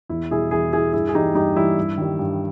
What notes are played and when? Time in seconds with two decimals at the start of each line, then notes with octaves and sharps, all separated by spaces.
0.09 E2 E4
0.31 B2 G3 E4 G#4
0.51 E2 E4 G#4
0.72 B2 G3 E4 G#4
0.93 G2 E4 G#4
1.09 G#4
1.14 E3 G3 D#4 G4
1.35 G2 D#4 G4
1.56 E3 G3 E4
1.78 G2
1.98 D#3 G3
2.19 G2